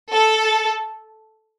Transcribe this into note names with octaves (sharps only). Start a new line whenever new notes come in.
A4